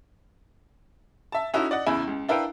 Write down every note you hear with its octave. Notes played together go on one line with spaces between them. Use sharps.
E5 A5
C#4 D#4 E4 F#4 A4
D5 D#5 F#5
E2 C#3 E4 G#5 B5
C#2
D4 E4 A#4 B4 F5 G5